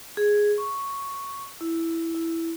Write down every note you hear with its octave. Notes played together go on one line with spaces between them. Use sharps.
G#4
C#6
E4
E4